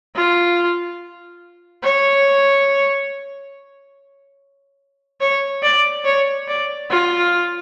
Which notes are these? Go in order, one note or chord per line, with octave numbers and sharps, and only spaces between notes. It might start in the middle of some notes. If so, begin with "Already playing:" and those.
F4
C#5
C#5
D5
C#5
D5
F4